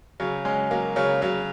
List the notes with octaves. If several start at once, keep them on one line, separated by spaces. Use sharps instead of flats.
C#3 F#3
G#3 C#4
F#3 A#3
C#3 F#3
C#3 F#3